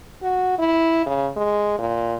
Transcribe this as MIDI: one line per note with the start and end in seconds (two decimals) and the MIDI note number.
0.23 0.57 66
0.58 1.04 64
1.06 1.29 49
1.36 1.75 56
1.79 2.17 46